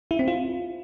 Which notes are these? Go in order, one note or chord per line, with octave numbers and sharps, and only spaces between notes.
E4
C4
F4